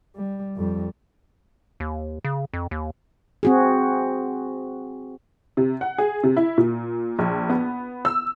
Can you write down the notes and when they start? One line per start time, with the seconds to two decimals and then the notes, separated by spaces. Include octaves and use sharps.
0.16 G3
0.56 F2 G3
1.80 D#2
2.25 C#3
2.53 F2
2.71 D#2
3.43 C4 F#4 G#4
5.57 C3
5.81 F#5
5.98 G#4
6.23 C3
6.37 E4
6.58 A#2
7.19 A#1
7.49 B3
8.05 E6